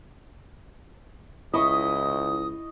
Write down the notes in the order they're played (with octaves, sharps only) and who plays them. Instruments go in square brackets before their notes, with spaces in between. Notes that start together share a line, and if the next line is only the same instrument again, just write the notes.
[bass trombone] C#2 [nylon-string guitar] E4 [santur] D#5 C#6 [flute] D#6